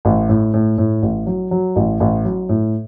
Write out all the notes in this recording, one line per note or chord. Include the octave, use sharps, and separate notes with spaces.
A1
A2
A2
A2
A1
F#3
F#3
A1
A1
F#3
A2